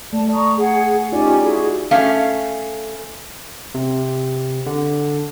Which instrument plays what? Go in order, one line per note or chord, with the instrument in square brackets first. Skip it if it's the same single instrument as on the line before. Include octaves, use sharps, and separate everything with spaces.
[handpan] A3 [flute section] D5 A5
[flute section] A#5 C#6 D#6
G#4 F#5
[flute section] C#4 G4 G#5 [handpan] D#4 F4 D5
[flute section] E4 F#4 G#4
[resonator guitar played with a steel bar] A3 C#4 F5
[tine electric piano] C3
D3